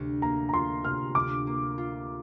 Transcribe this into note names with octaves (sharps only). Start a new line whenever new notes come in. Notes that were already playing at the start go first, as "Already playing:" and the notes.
Already playing: D2 C3
A#3 A#5
A#5
F4 C6
C3 F6
D2 D6
A#3
F4